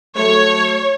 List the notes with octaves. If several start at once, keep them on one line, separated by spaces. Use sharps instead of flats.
F#3 A3 C#5